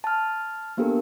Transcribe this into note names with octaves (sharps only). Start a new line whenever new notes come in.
A5 F6
A#3 B3 D4 G4 A4 A#4